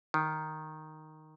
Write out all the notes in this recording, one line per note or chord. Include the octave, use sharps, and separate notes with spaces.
D#3